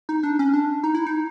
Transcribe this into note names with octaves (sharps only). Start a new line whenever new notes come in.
D#4
D4
C#4
D4
D#4
E4
D#4